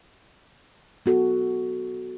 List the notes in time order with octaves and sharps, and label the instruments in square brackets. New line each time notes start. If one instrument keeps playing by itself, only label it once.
[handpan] B3 F#4 A4